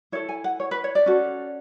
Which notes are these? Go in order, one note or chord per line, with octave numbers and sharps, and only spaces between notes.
E4 A4 C#5
G#5
F#5
C#5
B4
C#5
D5
C#4 F#4 A4